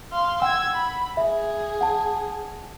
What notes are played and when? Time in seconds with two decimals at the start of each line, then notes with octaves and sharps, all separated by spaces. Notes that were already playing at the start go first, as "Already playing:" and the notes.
0.12 F5 C6
0.42 F#5 G5 E6 G#6
0.75 B5
1.17 G#4 E5
1.81 F#5 A5